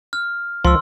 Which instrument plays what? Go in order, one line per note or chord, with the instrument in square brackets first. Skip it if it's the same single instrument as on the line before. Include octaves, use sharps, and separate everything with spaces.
[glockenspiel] F6
[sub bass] C#2 [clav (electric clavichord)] F3 [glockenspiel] C6 E6